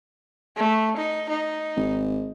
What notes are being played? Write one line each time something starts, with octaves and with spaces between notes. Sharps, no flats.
A3
D#4
D#4
G#1